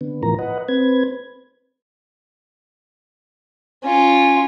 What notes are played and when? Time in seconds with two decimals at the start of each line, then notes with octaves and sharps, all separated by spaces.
0.01 D3 B3
0.23 A2 E3 F3 A#4 A#5
0.39 B4 D#5 F#5
0.68 C4 B4 G#6
3.83 C#4 F4